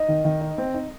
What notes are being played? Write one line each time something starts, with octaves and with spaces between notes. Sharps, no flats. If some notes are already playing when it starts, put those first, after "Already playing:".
Already playing: D#4 D#5
D#3
D#3
D#4
C4
D#4